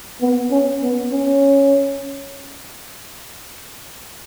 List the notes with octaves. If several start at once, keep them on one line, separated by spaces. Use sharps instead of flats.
B3
C#4
B3
C#4